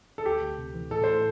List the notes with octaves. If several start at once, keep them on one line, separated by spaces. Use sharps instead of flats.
A4
D2 G4
D2
C3
E3
A2 A4
A2 C5